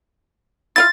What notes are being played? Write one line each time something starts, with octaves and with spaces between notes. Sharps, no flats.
E4 F4 F5 A6